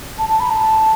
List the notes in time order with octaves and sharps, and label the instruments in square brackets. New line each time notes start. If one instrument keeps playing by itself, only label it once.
[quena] A5
A5
B5
A5